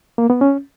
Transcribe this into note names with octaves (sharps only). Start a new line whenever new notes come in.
A#3
B3
C#4